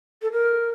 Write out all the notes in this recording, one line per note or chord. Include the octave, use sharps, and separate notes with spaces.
A4
A#4